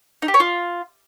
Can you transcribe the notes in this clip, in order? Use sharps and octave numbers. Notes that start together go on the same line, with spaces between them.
D#4
G4
C#5
F4